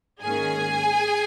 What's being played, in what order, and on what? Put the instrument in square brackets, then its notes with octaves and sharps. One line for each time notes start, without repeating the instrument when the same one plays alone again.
[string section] G#2 D#3 A#3 C#4 G#4 G#5